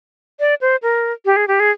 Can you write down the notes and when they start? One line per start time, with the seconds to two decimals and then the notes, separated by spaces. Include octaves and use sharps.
0.40 D5
0.61 C5
0.83 A#4
1.25 G4
1.36 G#4
1.48 G4
1.60 G#4